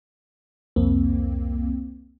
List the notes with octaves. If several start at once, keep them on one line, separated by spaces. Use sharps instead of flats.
C2 F2 A#3 C4